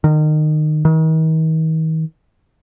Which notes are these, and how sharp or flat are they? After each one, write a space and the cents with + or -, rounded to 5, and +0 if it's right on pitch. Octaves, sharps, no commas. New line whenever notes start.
D#3 -25
D#3 +40